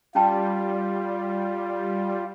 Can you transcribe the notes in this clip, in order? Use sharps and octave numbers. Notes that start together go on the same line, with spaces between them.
G3 C#4 F4 G5 A5